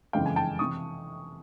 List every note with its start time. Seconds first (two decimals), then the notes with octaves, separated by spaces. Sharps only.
0.13 F#1 F2 C#3 E3 G#3 F5 G5
0.26 G#5
0.36 G5 A5
0.59 C3 E3 C#6 D#6